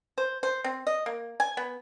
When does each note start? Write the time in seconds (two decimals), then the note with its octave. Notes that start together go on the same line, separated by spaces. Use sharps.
0.18 C5
0.43 C5
0.64 C4
0.87 D#5
1.06 A#3
1.40 G#5
1.57 B3